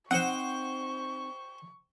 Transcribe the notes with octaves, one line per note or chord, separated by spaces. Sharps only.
C4 D#4 C5 F#5 G5 C#6